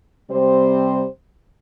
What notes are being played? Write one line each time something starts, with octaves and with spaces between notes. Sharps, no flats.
C3 G3 C4 G4 C5